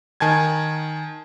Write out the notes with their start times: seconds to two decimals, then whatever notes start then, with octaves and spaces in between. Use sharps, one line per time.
0.20 D#3 G#5 A5 G#6